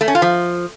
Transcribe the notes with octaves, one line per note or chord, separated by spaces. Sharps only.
A3
C#4
F4
F3